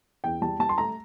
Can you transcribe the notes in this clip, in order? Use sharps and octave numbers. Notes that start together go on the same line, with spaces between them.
E2 G5
G3 A5
G3 A5
C6
A3 A#5